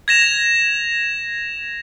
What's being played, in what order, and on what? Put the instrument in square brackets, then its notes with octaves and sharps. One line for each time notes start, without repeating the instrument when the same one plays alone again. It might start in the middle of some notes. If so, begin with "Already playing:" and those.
[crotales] G#6 A#6 E7 F7